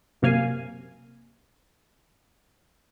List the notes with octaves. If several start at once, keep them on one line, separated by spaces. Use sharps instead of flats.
F#2 C3 A#3 F5 G#5